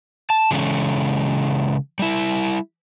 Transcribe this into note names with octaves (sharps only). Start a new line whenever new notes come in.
A5
C#3 E3 G#3 C#4 A4
G3 E4